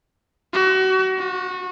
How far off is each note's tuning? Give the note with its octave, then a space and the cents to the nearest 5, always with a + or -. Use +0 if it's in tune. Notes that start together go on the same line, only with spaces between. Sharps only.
F#4 +30
F#4 -25